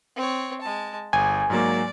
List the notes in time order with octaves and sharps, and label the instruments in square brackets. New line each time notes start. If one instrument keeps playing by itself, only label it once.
[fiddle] C4 C#5
G#3 A5
[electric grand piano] G1 [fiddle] G#4 [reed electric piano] G#5
[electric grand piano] G#2 F#3 A#3 [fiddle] D5